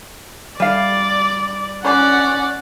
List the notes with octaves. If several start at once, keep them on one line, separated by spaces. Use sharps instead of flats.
G3 D5 F5
C#4 D5 F#5